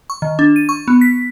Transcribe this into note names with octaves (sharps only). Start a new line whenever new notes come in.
C#6
D#3
D4
D#7
C#6
B3
B6